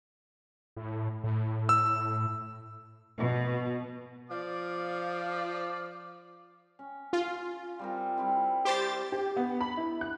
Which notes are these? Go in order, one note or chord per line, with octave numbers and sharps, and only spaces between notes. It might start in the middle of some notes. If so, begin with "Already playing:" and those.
A2
A2
E6
B2
F3 D5 F5 D6
C#4
F4
G3 C4 A#4
G3 C4 E4
G4 C5 A6
G4
B3
B5
E4
F#6